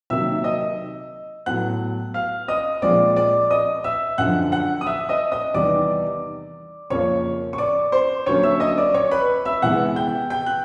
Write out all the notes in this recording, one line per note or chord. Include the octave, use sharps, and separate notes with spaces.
C3 D#3 F#3 A#3 E5 E6
D#5 D#6
A2 F#3 B3 F#5 F#6
F5 F6
D#5 D#6
A#2 F3 G#3 C4 D5 D6
D5 D6
D#5 D#6
E5 E6
F#2 D3 F3 F#5 F#6
F#5 F#6
D#6
E5 E6
D#5 D#6
D#5 D#6
E2 C3 D#3 G3 D5 D6
F2 C#3 F3 A#3 C#5 C#6
C#6
D5 D6
C5 C6
D3 F#3 A#3 C#4 C#5 C#6
E5 E6
D#5 D#6
D5 D6
C#5 C#6
B4 B5
E5 E6
C3 E3 G#3 B3 F#5 F#6
G5 G6
G5 G6
F#6